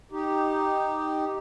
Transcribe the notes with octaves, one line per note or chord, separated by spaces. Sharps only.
D#4 G4